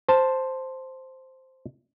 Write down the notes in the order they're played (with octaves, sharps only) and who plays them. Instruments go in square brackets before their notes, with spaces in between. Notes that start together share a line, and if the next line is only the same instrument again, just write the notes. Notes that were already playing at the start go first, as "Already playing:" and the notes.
[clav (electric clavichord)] C5 A5